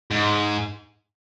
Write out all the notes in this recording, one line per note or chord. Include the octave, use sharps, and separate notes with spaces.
G#2